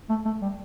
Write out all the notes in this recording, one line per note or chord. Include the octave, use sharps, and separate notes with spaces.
A3
A3
G3